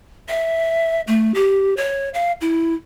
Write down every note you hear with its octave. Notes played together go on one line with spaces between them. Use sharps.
E5
A3
G4
C#5
F5
E4